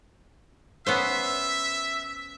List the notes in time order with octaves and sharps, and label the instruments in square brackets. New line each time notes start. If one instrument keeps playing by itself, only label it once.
[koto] B3 C#4 C5 [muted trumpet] E5